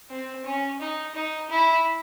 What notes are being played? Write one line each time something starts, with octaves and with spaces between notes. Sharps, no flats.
C4
C#4
D#4
D#4
E4